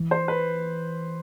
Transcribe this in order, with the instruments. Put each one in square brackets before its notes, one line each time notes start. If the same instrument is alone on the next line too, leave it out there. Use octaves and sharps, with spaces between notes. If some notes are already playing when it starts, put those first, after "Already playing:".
Already playing: [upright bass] E3
[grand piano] C5
B4